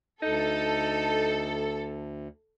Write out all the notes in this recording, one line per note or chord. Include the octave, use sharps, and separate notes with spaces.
D2 D#4 A4